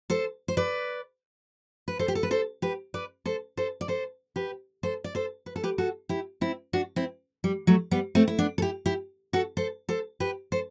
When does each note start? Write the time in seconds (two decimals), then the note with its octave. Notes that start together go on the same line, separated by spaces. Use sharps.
0.10 A4 C5
0.48 C5
0.57 B4 D5
1.88 B4
1.99 A4 C5
2.08 G4
2.15 A4
2.23 B4
2.31 A4 C5
2.62 G4 B4
2.94 B4 D5
3.25 A4 C5
3.57 A4 C5
3.81 D5
3.88 A4 C5
4.36 G4 B4
4.83 A4 C5
5.04 D5
5.15 A4 C5
5.46 B4
5.56 A4
5.63 G4 B4
5.78 F#4 A4
6.09 E4 G4
6.41 C4 E4
6.73 D4 F#4
6.96 C4 E4
7.44 G3
7.67 F#3 A3
7.91 G3 B3
8.15 A3 C4
8.28 E4
8.39 B3 D4
8.58 A4
8.62 E4 G4
8.86 E4 G4
9.33 F#4 A4
9.57 A4 C5
9.89 A4 C5
10.20 G4 B4
10.52 A4 C5